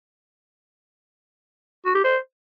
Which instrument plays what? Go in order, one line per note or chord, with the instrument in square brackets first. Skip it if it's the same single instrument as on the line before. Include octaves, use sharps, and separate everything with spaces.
[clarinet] F#4
G4
C5